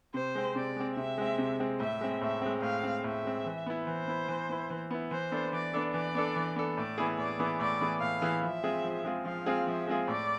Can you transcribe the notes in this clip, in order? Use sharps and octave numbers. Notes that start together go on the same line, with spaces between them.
C3 C5
G#3 C4
C3 D5
G#3 C4
C3 E5
G#3 C4
C3
G#3 C4
A2 E5
G#3 C4
A2 E5
G#3 C4
A2 F5
G#3 C4
A2 E5
G#3 C4
E3
B3 E4
E3 C5
B3 E4
E3
B3 E4
E3
B3 E4
E3 C5
B3 D4 A4
E3 D5
B3 D4 A4
E3 D5
B3 D4 A4
E3
B3 D4 A4
A2 D5
E3 B3 E4 G#4
A2 D5
E3 B3 E4 G#4
A2 D5
E3 B3 E4 G#4
A2 F5
E3 B3 E4 G#4
F3 E5
G#3 C4 F4 G#4
F3
G#3 C4 F4 G#4
F3 F5
G#3 C4 F4 G#4
F3 E5
G#3 C4 F4 G#4
A2 D5